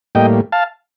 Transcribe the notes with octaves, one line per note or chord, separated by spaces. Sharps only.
A2 G3 A#3 D#5 G5
F5 A5